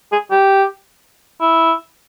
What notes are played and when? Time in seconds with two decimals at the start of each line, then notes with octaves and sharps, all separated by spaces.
0.12 G#4
0.31 G4
1.40 E4